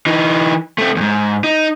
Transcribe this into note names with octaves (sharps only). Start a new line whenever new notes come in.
E3 D#4
A3 C4
E2 G#2
D#4